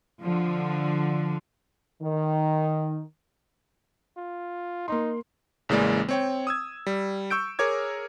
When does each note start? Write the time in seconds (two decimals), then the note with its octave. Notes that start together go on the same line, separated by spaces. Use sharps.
0.20 D3 F3
2.02 D#3
4.17 F4
4.88 A#3 D#4 C6
5.69 A1 C#3 E3 G#3 A#3 D5
6.09 C4 C#5 G5
6.47 D#6 E6 G#6
6.86 G3
7.30 C#6 E6 G6 D7
7.59 G#4 A#4 C#5 D6 G#6